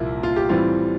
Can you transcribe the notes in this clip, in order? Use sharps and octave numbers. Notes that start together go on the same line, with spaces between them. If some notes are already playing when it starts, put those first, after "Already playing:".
Already playing: C2 A#2 F3 A#3 E4
F4
G4
A2 E3 G3 C4 F4